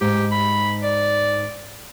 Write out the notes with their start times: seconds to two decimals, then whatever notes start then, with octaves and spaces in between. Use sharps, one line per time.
0.01 G#2 G4
0.31 B5
0.84 D5